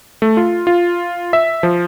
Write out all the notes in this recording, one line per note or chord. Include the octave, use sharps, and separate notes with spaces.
A3
F4
F4
E5
F3